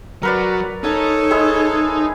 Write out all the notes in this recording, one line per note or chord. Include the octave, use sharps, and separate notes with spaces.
F#3 A#4 B4 D5
D#4 A4 C#5 G#5
G#3 E4 G#4